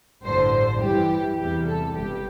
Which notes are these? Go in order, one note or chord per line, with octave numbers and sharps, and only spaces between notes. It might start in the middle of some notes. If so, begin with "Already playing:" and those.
A1 G2 D3 C5
G2 E3 G3 G4
E2 C3 E3 G3 G4
A4
G1 G2 G3 G4